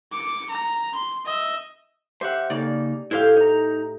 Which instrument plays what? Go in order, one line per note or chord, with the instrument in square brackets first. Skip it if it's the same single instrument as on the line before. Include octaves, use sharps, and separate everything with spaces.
[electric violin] D6 C#7
A#5
C6
D#5 E5
[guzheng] G4 [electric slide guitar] C5 E5 F#5
[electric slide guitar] C#3 A#3 D#4 [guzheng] D5
[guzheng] A2 G4 [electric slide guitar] E4 C5 F5
[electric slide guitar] D#4 A#5